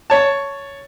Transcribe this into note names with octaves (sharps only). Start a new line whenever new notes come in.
C#5 A5